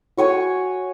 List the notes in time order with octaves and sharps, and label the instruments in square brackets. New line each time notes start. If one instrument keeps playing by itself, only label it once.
[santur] F#4 C#5 G#5 C#6